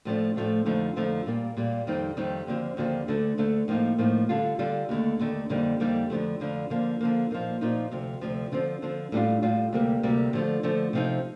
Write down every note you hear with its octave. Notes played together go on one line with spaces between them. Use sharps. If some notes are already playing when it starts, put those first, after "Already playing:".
A2 F3 A3 D4
A2 F3 A3 D4
F2 D3 F3 A3 D#4
F2 D3 F3 A3 D#4
A#2 G3 A#3
A#2 G3 A#3
F2 D#3 G3 C4 D#4
F2 D#3 G3 C4 D#4
D#2 D3 F3 C4
D#2 D3 F3 C4
D2 D3 A3
D2 D3 A3
A2 F3 A#3 D#4
A2 F3 A#3 D#4
D3 G3 D4 F4
D3 G3 D4 F4
D#2 D3 A3
D#2 D3 A3
F2 D3 G3 A#3 D#4
F2 D3 G3 A#3 D#4
F2 D3 F3 A3
F2 D3 F3 A3
D3 F3 A#3
D3 F3 A#3
A#2 F3 A#3 D#4
A#2 F3 A#3 D#4
D2 C3 F3
D2 C3 F3
D3 F3 C4
D3 F3 C4
A2 G3 D4 F4
A2 G3 D4 F4
D2 C3 G3 A#3
D2 C3 G3 A#3
D3 F3 A3
D3 F3 A3
C3 F3 C4 D#4